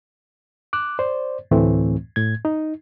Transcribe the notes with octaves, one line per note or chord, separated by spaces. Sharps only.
D6 F#6
C5 D5
D2 A2 E3 A3 C4
A2 G#6
D#4